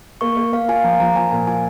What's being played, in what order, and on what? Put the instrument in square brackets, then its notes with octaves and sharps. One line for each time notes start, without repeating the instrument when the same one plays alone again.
[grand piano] A#3 [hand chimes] C#6
[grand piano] A#3
[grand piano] A#3 [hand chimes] F5
[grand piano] F4 [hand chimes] G#5
[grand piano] F3 [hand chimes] A#5
[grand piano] F3 [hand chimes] A#5
[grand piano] F3 [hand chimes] G#5
[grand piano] A#2 [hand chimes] G#5
[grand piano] F4 [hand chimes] G#5